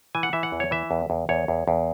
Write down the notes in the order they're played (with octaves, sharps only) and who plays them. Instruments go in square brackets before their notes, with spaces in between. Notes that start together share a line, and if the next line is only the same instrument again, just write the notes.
[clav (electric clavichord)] E3 G#5
F#5
E3 E5
F#5
E2
C#5
E3 E5
E2
E2
E2 C#5
E2
E2